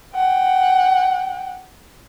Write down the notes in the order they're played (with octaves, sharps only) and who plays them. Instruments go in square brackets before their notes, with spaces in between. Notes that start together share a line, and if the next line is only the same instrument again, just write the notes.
[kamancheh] F#5 G5